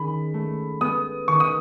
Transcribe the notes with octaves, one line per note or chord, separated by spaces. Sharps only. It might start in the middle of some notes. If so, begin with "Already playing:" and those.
Already playing: D#3 C#4 G#4 B5
A3
B3 D#6
D#3 C#6
D#6